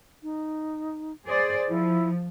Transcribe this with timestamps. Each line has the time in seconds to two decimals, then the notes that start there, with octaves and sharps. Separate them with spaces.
0.23 D#4
1.27 G#4 C5 D5
1.68 F3 E4